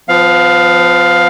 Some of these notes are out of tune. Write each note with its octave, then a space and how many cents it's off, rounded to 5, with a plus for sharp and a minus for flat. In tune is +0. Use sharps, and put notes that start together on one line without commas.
F3 +10 B3 +45 F5 +10